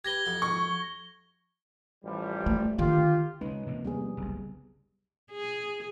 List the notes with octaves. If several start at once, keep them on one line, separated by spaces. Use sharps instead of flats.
G4 B4 G#6 A#6 G7
F2 F#4
C#6
A1 F3 G3
A3
D3 D#3 F4 G4
C#3 G#3 C#4 D#4 B4
C3 F3 A#3
G3 B3 G#4
F#1 C2
G#4